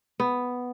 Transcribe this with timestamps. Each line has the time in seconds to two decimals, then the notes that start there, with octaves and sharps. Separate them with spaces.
0.20 B3